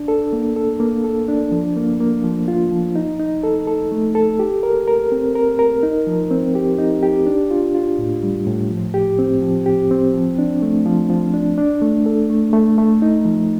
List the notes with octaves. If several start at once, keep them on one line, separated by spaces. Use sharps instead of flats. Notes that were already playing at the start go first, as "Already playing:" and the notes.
Already playing: D4
A4
A#3
A4
A#3
A4
D4
F3
A#3
A#3
F3
F4
F3
D#4
D#4
A4
A4
A3
A4
G4
A#4
A#4
C4
A#4
A#4
D#4
F3
C4
G4
D#4
G4
D4
F4
F4
A2
G3
A2
F3
G4
C4
F3
G4
C4
F3
D4
A3
F3
F3
D4
D4
A3
A4
A3
A3
A3
D#4
F3